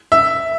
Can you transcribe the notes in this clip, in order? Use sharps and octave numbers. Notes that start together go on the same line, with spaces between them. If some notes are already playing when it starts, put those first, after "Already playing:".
E5